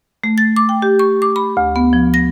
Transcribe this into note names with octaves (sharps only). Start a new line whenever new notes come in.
A3
A6
D6
G5
G4
C#6
D6
B5
D2
B3
F3
A#6